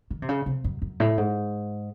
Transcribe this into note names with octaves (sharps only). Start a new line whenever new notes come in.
D#3
C3
C#3
C3
F#2
F#2
A2
G#2